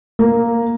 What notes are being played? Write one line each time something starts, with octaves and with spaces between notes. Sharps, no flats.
A#3